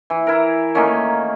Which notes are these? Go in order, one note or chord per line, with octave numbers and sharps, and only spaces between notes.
E3
E4 A#4
D#3 A3 A#3 C#4